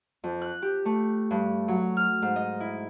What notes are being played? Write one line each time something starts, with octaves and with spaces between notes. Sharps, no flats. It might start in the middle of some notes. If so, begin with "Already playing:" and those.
F2
F#6
G4
A3
G2
F#3
F6
G#2
D#5
E4